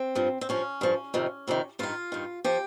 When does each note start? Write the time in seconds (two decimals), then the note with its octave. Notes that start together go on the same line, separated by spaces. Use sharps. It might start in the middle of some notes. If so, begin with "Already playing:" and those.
Already playing: C4
0.15 G2 F3
0.41 C4
0.49 G2 F3 C#4
0.81 G2 F3
1.14 F2 C3 D#3
1.47 F2 C3 D#3
1.79 G2 D#3 F4
2.12 G2 D#3
2.44 F3 G4